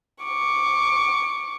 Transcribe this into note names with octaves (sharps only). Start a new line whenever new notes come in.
C#6 D6